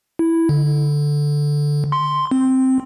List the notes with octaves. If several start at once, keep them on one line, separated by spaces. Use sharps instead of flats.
E4
D3
C6
C4